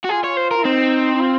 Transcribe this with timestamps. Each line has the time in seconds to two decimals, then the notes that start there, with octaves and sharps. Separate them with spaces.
0.04 F#4
0.09 F4 G#4
0.24 C#5
0.37 C5
0.51 A#4
0.57 F4
0.65 C4 D#4
1.16 D#4
1.21 F4